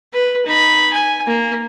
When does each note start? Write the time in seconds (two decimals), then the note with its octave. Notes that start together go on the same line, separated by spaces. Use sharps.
0.13 B4
0.46 D#4 B5
0.93 G#5
1.27 A#3